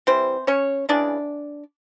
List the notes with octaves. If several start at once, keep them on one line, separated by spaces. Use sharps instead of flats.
C3 E3 G3 C4 C5
C#4 C#5
C#3 E3 G#3 D4 D5